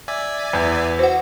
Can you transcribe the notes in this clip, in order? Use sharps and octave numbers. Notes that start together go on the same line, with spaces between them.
D5 E5 G#5
E2
F#4 C5 F#5